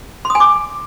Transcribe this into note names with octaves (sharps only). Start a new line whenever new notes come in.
C6
D#6
G#5
D6